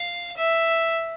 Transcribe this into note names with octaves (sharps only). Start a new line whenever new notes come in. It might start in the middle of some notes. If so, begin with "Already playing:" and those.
Already playing: F5
E5